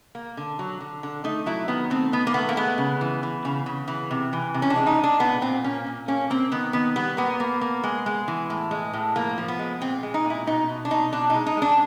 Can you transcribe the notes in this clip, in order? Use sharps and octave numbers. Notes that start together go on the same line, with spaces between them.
A#3
D3
F#3
D3
D3
A3 D#4
F#3 E4
D#3 B3
A3 C4
D#3 B3
A#3
A3 B3
A#3
G#3 B3
C#3
E3
E3
C#3
C#3
E3
C3
E3
C3
C#4
D4
G#3
D#4
C3
D4
A#2 B3
A#2 C4
A#3 C#4
A#2
A#3 C#4
A#3 C4
D#3 B3
D#3 B3
G3 B3
A#3 B3
A#3
A#3
G#3
G#3
E3
A2
G#3
A2
F3 A#3
F3
B3
G#3
A#2 C4
G#3
D#4
A#2
E4
B2 D#4
B2
D4
B2 D#4
B2 D4
D#4
G#3
D#4
G#3 D4